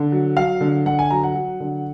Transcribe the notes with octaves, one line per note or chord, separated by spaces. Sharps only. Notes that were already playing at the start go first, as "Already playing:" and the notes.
Already playing: D3
F#3
F#3 F5
D3
D3 F#5
G#5
F#3 A#5
F#5
F#3
D3